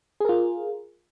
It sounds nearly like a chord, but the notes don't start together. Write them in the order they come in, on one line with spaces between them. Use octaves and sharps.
G#4 A#4 F4